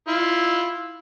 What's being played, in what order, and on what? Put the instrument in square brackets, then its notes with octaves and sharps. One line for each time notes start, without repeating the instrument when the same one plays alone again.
[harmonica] E4 F4